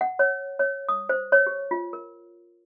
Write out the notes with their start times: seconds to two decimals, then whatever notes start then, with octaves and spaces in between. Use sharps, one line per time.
0.01 F#5
0.19 C#5
0.59 C#5
0.89 D#6
1.09 C5
1.32 C#5
1.47 G4
1.71 F4
1.93 A#4